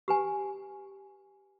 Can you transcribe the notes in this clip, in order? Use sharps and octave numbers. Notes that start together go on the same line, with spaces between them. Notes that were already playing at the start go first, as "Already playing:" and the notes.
G4 B4 G#5